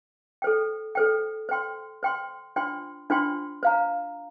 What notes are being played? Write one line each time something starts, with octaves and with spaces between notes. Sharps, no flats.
A4 C5 G5
A4 C5 G5
C5 G5 C6
C5 G5 C6
D4 F4 C5 G5 C6
D4 F4 C5 G5 C6
C5 F5 A#5